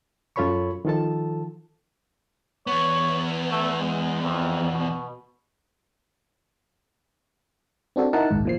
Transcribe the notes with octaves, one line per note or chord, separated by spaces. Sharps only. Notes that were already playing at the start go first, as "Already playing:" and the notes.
F#2 F4 A4 C#5 B5 C#6
D#3 F3 F4 A4 A5
E2 B3 C#5
A3
G#3
F2
B2
C4 D4 F#4 A4
D#4 E4 A#4 F#5 A5
A#1 D#2 G#2
A#2 F3 C7